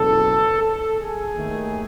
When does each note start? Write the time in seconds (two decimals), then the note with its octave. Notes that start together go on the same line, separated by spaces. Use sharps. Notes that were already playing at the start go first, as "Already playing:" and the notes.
Already playing: F#1 E2 B2 F#3 A4
0.62 A4
0.99 G#4
1.36 D#2 D#3 A3